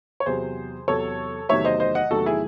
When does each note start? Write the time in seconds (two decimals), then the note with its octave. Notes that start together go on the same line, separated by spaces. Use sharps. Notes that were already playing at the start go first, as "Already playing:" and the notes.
0.20 C#5
0.26 E2 C3 F#3 G#4 C5
0.88 E2 C3 F#3 A4 C#5
1.49 E2 C3 D#3 F#3 A3 C#5 E5
1.65 C5 D#5
1.80 C5 D#5
1.95 D#5 F#5
2.11 E2 C3 D#3 F#3 A3 F#4 A4
2.26 E4 G#4